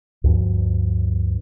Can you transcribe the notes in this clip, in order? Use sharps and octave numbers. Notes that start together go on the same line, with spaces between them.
D2 G2 F3